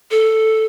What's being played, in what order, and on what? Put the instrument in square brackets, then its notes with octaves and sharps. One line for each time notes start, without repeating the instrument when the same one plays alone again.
[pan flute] A4